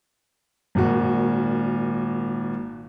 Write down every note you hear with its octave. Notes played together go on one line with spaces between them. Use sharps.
G#1 A#2 F#4